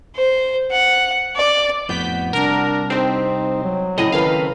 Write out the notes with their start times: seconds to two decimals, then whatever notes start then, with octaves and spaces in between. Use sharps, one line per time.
0.14 C5
0.70 F#5
1.34 D5
1.89 F2 A2 B3 F#4 G6 B6
2.33 C2 D4 A#4
2.90 C4 D#4 G4 C5
3.63 F#3
3.98 A2 C#3 C4 G#4 D#5
4.12 D#3 A3 B4 F5